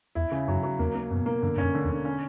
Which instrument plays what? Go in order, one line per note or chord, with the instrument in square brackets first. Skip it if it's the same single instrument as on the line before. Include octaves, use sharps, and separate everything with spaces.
[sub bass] E2 [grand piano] E4
[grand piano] C#3
[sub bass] F#2 [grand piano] F#3
[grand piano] F#3
[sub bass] E2 [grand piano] A#3
[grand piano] A#3
[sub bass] F#2 [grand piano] B2
[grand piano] A#3
[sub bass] G2 [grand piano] D3
[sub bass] G2 [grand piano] C#4
[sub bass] F#2
[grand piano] D3
[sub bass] E2
[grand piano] D3
C#4